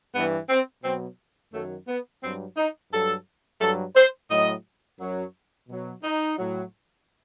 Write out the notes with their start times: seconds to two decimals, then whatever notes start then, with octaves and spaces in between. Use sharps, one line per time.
0.14 G2 E3 B3
0.49 C4
0.83 B2 F#3 C4
1.52 F#2 D#3 F#3 A3
1.87 B3
2.22 G2 F#3 C4
2.57 D#4
2.92 G2 F#3 A4
3.60 G2 F#3 A4
3.95 C5
4.30 A2 F#3 D#5
4.99 F#2 F#3
5.68 B2 F#3
6.03 D#4
6.38 A2 F#3